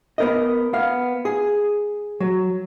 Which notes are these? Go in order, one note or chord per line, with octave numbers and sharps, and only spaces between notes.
B3 A#4 D#5
B3 F5
G#4
F#3